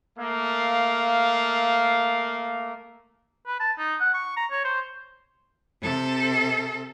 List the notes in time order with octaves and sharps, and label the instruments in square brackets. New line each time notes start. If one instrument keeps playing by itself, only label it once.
[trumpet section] A3 A#3 [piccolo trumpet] F5
[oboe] B4
A5
D#4
F#5
C#6
A#5
C#5
C5
[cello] C3 A4